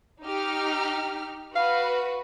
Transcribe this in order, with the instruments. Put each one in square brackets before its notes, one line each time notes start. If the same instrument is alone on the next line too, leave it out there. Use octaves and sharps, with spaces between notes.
[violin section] D#4 G4 F6
[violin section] F#4 B4 [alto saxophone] F5